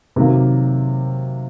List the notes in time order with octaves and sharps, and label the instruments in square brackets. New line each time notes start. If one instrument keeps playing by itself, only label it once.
[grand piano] C3 D#3 F#3 A#3